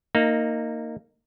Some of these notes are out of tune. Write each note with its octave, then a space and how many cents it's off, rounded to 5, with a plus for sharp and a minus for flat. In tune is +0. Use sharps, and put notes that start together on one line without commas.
A#3 -15 D#4 +0